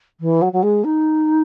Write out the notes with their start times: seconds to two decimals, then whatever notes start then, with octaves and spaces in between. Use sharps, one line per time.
0.20 E3
0.42 F#3
0.53 F#3
0.63 G#3
0.84 D#4